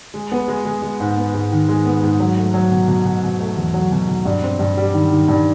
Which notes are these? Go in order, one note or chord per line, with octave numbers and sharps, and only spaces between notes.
G#3
B3
G#3
G#3
G#3
G#2
B3
G#2
D#3
G#3
B3
G#2
F#3
A3
F#3
B2
B2
B2
B2
A3
E2
F#3
B2
B2
G2
C4
G2
G3
D#3
D#3
G2